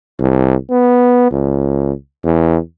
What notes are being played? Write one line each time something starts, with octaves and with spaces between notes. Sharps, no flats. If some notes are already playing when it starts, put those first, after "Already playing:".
C2
B3
C#2
E2